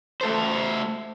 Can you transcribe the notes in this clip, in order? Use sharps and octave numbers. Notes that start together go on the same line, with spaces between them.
A3 A4 C5